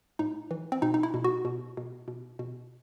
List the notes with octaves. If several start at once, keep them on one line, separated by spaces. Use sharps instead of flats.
A2 D#4
E3
C4
B2 D#4
D#4
E4
B2
F#4
B2
B2
B2
B2